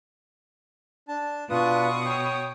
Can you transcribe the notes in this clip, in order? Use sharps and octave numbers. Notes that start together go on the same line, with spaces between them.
D4 A5
B2 D4 F4 B4 C#6 D#6
C#5 G5